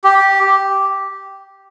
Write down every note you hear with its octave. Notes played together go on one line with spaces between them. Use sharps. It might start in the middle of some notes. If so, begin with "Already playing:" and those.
G4